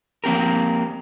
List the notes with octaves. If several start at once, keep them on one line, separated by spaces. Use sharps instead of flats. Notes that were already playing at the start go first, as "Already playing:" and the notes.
F3 A#3 C4 G4 A#4